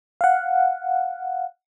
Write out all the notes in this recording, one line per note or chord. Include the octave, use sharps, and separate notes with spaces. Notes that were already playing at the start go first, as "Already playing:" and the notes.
F5 F#5